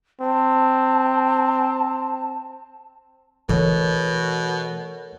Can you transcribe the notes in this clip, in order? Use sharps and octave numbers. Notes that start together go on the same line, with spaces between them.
C4 A5
B2 E3 A3 A4 A#4 C#5